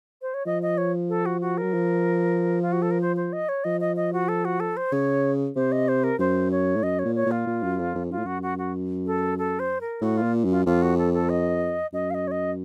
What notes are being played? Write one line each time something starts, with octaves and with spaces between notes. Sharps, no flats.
C5
C#5
F3 D#5
D#5
C#5
A4
F#4
F#4
F#3 A#4
F3
F4
F#4
A4
A#4
C5
C5
D#5
C#5
F3 D#5
D#5
D#5
F#4
A4
F#4
A4
C5
C#3 C#5
C3 C5
D#5
C5
A#4
F#2 C5
C#5
A2
F#2 D#5
C#5
A#2
C#5
A#2 F4
A#2
F#2
F2
F2
F#2 F4
A2
F#2 F#4
F#4
F#4
A4
A4
C5
A#4
A2 F#4
F4
A#2
F#2
F4
F2 F4
F#4
A4
A4
D#5
F#2 D#5
F5
D#5
C#5
D#5